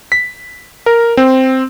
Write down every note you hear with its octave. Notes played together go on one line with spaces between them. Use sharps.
B6
A#4
C4